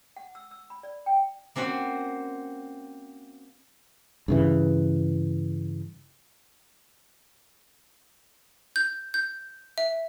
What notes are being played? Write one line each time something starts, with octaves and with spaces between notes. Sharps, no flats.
F#5
E6
E6
B5
D5
G5
A#3 C4 C#4 F#4
G2 C#3 E3
G6
G6
E5